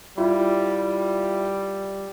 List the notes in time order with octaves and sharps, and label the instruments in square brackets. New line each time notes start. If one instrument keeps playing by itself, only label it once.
[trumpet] G3 [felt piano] E4 F4